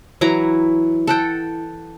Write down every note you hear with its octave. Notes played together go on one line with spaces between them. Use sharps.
E3 F#3 E4 A#5
A4 F#5 G5